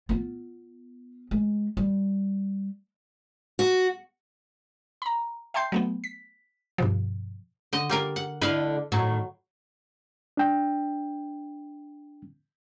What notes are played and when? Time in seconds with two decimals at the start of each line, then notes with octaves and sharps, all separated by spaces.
0.09 B3 F4
1.31 G#3
1.77 G3
3.59 F#4
5.02 A#5 B5
5.54 E5 G5 A5 C6 G6 C7
5.72 F#3 A3 B3
6.04 B6
6.78 G2 B2 F3
7.73 D3 D#5
7.90 G3 A#3 A#4
8.16 F#5
8.42 D3 A3 E4 B4 F5
8.92 A2 D#3 F#3
10.37 D4 G5